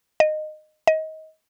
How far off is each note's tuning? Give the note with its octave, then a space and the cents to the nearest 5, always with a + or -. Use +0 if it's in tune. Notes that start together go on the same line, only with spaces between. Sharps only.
D#5 -15
D#5 +25